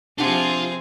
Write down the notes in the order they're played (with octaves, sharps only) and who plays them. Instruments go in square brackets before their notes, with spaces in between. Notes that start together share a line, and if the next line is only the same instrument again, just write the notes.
[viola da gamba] C3 F3 [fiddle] C4 G#4 [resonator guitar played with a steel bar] D4 G4 F#5 [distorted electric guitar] F4